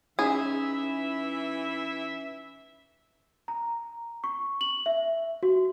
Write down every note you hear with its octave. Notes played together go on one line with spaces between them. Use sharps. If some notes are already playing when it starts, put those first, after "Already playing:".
E3 C#4 D#4 G#4 E5
A#5
C#6
F#7
E5
F#4